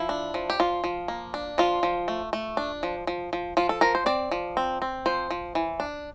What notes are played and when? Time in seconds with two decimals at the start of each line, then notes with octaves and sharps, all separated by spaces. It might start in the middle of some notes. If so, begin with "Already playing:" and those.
Already playing: F3 E4
0.09 D4
0.34 F3
0.50 G4
0.60 F3 F4
0.84 F3
1.08 A#3
1.34 D4
1.58 F3 F4
1.83 F3
2.08 A3
2.33 A3
2.57 D4
2.83 F3
3.07 F3
3.33 F3
3.57 F3 F4
3.69 A4
3.81 F3 A#4
3.95 C5
4.06 C4 D5
4.31 F3
4.57 C4
4.82 C4
5.06 F3 C5
5.30 F3
5.55 E3
5.80 D4